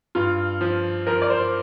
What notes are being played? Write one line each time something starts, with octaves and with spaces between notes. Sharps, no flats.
G2 F4
F3
F3 A#4
D5
C5